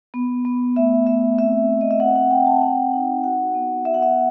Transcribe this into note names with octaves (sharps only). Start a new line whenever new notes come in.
B3
B3
A3 E5
A3 E5
C4 E5
C4
D#5
E5
C4 F#5
F#5
C4 G5
A5
G5
C4 F#5
D#4
F#4 F#5
B3
B3 E5
F#5
E5